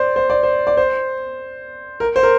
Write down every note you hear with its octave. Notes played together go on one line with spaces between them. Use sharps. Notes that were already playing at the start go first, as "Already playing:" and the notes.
Already playing: C5 D5
C5
D5
C5
D5
C5
A#4
C5
A#4